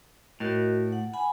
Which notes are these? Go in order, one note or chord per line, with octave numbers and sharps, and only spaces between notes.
A2 F#4 A#4 D#5
F#5
F#5 G#5 B5